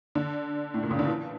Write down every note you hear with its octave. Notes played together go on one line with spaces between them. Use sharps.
D3
A2
A#2
C#3
D3
E3